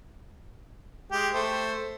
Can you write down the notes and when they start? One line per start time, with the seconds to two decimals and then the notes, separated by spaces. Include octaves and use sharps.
1.12 G#3 G4
1.34 A3 C5